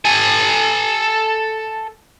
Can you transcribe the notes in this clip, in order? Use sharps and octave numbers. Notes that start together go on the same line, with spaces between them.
A4 G#5